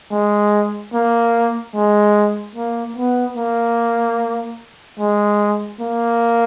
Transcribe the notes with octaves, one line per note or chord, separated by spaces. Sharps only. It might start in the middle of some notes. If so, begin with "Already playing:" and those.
G#3
A#3
G#3
A#3
B3
A#3
G#3
A#3